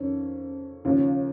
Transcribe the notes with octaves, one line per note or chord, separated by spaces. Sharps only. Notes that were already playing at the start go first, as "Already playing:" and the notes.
Already playing: F2 D#3 C#4
D#2 C#3 F3 C#4